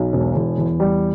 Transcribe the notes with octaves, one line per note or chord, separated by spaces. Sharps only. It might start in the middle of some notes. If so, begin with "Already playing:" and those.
Already playing: B1
E1
E2
E2
G3